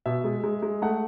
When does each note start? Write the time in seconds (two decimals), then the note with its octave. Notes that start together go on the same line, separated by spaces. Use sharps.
0.06 B2 E5
0.24 G#3
0.44 G#3
0.63 G#3
0.82 A3 F#5